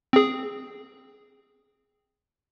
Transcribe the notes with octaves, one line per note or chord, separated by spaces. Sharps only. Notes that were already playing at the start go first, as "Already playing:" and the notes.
C4 G#4